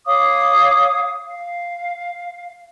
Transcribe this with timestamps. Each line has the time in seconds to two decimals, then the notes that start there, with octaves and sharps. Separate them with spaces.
0.06 C#5 F5 D6 D#6
1.26 F5